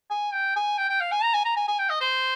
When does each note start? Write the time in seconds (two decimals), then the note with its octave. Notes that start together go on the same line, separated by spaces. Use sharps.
0.10 G#5
0.33 G5
0.56 G#5
0.78 G5
0.89 G5
1.01 F5
1.12 G#5
1.23 A#5
1.34 G#5
1.45 A#5
1.56 G#5
1.68 G#5
1.79 G5
1.90 D#5
2.01 C5